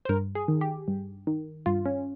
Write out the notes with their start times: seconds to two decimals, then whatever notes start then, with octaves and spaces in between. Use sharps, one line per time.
0.05 C5
0.09 G2 A#4
0.35 G#4
0.48 D#3
0.61 G4
0.88 G2
1.27 D#3
1.66 G2 F4
1.86 C#4